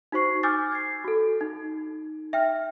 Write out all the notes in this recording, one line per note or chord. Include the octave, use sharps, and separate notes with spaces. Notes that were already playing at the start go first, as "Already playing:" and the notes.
D#4 F#4 C5 C#6 C7
G#5 D6 E6 F6 G6 A6
G#6 C7
F#4 A4
D#4
E5 G5 F6